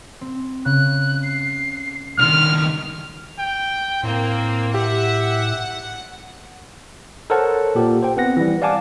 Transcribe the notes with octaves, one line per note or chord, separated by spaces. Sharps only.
C4
C#3 F#6
C7
C2 D#3 D4 C6 F6
G5
A2 A#3 C4
G4 E5 F#5
A4 A#4 C5 C#5 F#5 A5
A#2 G4
C5 G5
B3 C4 F#5 A#6
E3 G3
D5 F5 F#5 G#5 A5 D6